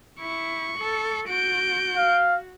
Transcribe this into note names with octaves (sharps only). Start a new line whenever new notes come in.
E4 C#6
A4
F#4 G6 D7
F5